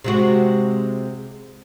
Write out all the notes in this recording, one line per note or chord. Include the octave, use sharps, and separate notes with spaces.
C3 G#3 F#4